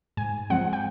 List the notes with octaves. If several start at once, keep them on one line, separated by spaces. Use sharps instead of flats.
G#2 G#5
F3 G#3 C4 F#5
G5